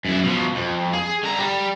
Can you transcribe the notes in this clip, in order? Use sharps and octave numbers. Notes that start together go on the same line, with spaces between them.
F#2 E4
B2 F3
F2
G#4
D3 A#5
G3